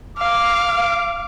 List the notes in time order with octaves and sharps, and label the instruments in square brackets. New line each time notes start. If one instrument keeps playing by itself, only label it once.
[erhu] F5 [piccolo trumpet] D6